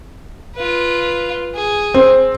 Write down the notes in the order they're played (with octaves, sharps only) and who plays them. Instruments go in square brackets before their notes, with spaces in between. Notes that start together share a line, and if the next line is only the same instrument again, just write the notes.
[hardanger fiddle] F4 B4
G#4
[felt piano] C4